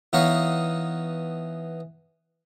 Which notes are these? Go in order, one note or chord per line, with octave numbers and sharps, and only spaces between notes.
E3 B3 D#4 C#5 D#5 F5